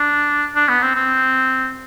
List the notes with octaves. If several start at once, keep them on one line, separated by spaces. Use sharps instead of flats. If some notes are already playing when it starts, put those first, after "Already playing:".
Already playing: D4
D4
B3
C4
C4